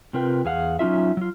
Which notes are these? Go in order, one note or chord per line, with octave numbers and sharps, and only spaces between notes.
C3 C4 F4 A#4 B4 G5
E2 G#4 F5 F#5
F#3 C#4 D#4 F4 E5
F#3 F4